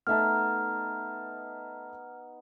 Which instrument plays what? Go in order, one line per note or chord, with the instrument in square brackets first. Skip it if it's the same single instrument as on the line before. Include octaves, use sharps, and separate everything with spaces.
[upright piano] A3 E5 A5 [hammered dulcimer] B3 D#4 [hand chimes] F6